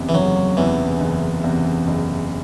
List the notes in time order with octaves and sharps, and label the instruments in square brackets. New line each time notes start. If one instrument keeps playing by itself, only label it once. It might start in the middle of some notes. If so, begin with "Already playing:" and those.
Already playing: [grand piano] F#1 E2 C3
[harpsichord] E3
[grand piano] F#1 [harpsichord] F#3
[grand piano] E2 C3 [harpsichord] E3
[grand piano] F#1
E2 C3
F#1